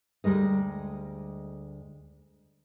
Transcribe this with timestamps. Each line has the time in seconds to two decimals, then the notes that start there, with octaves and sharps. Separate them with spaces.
0.24 D2 G3 G#3 A#4 D#5